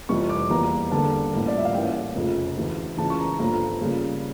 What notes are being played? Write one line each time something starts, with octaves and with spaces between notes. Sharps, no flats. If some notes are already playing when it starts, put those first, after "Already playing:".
F1 F2 E3 G3 C#6
D6
E2 E3 G3 A#3 A#5
E2 D3 G3 A#3 A5
A1 A2 G3 A#3
D5
E5
F5
A1 A2 G3 A#3 G5
F1 F2 C#3
D2 C#3 E3
C#2 C#3 E3 A5
C#6
A#5
G1 G2 F3 A3 A#5
F2 C#3 G3 A#3